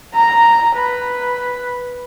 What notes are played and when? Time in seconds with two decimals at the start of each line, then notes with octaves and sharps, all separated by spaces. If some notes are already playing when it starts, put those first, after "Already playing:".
0.14 A#5
0.76 B4